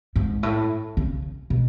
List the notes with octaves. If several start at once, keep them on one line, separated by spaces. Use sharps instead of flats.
G#2
A2
C#3
B2